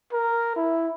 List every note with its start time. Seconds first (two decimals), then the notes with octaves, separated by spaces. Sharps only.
0.13 A#4
0.56 E4